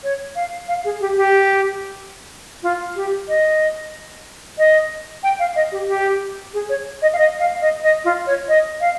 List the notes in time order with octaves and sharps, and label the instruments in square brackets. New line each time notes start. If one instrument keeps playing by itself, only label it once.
[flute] C#5
F5
F5
G#4
G4
G4
F4
G4
D#5
D#5
G5
F5
D#5
G4
G4
G#4
C#5
D#5
F5
D#5
F5
D#5
D#5
F4
C#5
D#5
F5